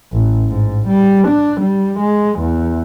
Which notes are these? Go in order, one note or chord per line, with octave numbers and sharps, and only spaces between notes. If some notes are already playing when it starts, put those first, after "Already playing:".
A1
G#2
G3
D4
G3
G#3
E2